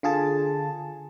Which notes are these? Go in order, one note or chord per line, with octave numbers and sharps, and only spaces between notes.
D3 F4 G#4 A5